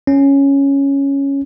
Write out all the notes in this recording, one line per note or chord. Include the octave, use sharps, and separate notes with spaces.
C#4